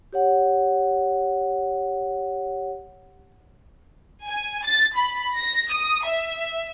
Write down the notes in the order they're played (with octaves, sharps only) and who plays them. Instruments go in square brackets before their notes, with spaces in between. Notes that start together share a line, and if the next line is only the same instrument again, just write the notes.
[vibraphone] G4 C#5 F#5
[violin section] G#5
A6
B5
A#6
D#6
E5